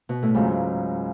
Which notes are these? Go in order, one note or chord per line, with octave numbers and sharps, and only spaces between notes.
B2
A2
C#2 G#2 C#3 F#3